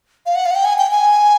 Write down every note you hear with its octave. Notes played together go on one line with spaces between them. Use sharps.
F5
F#5
F5
F#5
G5
G#5
G5
G#5